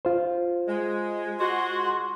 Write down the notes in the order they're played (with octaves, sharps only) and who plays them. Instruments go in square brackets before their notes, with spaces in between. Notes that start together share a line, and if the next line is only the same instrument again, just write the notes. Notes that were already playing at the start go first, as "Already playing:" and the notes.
[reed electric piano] F4 C5
[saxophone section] G#3
[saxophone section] G#3 F#4 [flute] C6